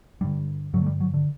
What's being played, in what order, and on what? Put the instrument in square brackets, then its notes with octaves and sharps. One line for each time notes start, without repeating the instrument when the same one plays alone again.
[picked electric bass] G2 D3 G3
G2 D3 F#3
A3
G3
F#3
D3